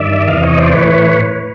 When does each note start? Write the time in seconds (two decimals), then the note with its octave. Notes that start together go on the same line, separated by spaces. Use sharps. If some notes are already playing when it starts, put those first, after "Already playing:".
Already playing: G2 D#3 D5 E5
0.28 E2 C3 E3 D#5 F5
0.43 C#5 D#5
0.58 C5 D5
0.73 A2 E3 B4 C#5